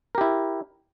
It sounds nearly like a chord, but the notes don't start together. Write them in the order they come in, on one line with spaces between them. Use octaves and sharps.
A#4 G4 E4